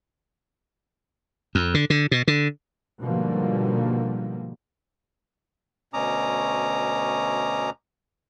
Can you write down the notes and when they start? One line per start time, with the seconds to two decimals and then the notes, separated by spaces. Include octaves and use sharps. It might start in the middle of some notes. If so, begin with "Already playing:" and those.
1.55 F2
1.74 D3
1.90 D3
2.11 B2
2.28 D3
3.01 G#2 B2 D3 F3 G3 A#3
5.94 D2 B2 C#4 A#5 D6 D#6